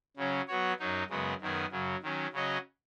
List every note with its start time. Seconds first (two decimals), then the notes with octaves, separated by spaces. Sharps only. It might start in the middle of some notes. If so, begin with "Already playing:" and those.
0.17 C#3 F#3 C#4
0.48 F#3 B3 F#4 C#5
0.80 F#2 F#3 D#4
1.10 F#2 C#3 G#3 B3
1.41 F#2 D#3 B3 G#4
1.71 F#2 C#3 F#3
2.02 D#3 F#3 C#4
2.33 C#3 F#3 C#4 F#4 D#5